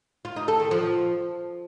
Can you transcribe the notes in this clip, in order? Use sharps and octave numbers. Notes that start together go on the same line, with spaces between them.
F4
D#4
A4
D#3
F3